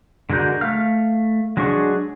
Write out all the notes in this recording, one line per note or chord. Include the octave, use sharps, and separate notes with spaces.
D3 G#3 F#4 A#4 G6
A3 F5 F6
F#3 G#3 D4 G#4 C#6